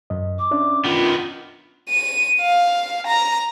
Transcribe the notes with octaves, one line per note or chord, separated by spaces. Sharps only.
F#2 D#5
D6
C#4 D4 E5
D#3 B3 F4
D#7
F5
A#5